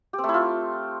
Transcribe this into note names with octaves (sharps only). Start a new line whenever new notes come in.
G4
C4
A3
E4
F4